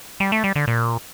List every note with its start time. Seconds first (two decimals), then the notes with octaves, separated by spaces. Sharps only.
0.20 G3
0.32 A3
0.44 G3
0.56 D3
0.67 A#2